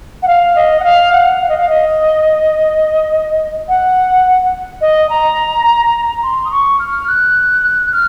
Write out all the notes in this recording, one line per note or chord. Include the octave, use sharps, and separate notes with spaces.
F#5
F5
D#5
F#5
F5
F#5
F5
D#5
F5
D#5
F#5
D#5
A#5
C6
D#6
C#6
F6
F#6
F6